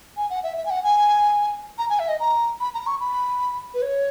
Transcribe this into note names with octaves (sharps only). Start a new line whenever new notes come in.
G#5
F#5
E5
E5
G#5
F#5
G#5
A#5
G#5
E5
D#5
A#5
B5
A#5
C#6
B5
B4
C#5